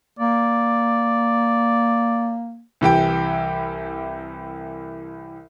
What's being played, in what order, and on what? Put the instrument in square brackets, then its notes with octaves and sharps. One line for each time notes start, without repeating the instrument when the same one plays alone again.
[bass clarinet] A#3 [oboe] D5
[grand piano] C2 E3 G4 G5